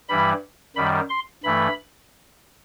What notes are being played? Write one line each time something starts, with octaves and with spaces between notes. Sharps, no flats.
G2 E3 G3 B5
F#2 D#3 G3 B5
C6
G2 E3 A3 B5